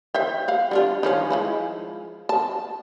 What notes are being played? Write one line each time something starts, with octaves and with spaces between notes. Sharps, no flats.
C5 E5 G5
F5 F#5
G3 D4 F4
D#3 F3 C#4
F3 G#3 E4
A5